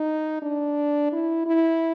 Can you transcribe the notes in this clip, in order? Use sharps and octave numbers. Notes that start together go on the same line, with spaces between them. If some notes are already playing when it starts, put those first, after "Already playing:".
Already playing: D#4
D4
E4
E4